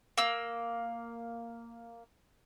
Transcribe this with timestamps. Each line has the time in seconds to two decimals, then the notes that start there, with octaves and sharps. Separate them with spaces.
0.18 A#3 E6